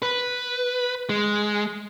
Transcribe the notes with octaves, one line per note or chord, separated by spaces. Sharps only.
B4
G#3